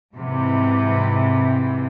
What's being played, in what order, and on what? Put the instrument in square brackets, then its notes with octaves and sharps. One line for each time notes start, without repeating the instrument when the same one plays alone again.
[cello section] G#2 C3 E3